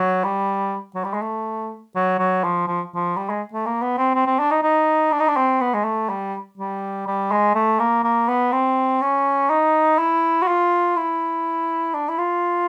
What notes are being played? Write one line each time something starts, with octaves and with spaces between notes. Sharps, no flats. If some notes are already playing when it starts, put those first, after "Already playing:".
Already playing: F#3
G3
F#3
G3
G#3
A3
F#3
F#3
F3
F3
F3
G3
G#3
A3
A#3
B3
C4
C4
C4
D4
D#4
D#4
D4
D#4
D4
C4
B3
G#3
A3
G3
G3
G3
G#3
A3
A#3
A#3
B3
C4
C#4
D#4
E4
F#4
F4
E4
D4
E4
F4